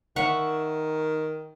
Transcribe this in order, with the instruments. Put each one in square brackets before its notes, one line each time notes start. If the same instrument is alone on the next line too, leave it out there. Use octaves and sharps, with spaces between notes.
[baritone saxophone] D#3 [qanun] E5 F#5 C#6